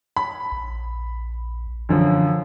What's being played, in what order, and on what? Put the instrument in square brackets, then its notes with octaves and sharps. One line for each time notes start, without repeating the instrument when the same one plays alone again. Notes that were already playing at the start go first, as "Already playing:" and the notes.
[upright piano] B5
[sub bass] A#1
[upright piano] F#2 D3 F3 [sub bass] E3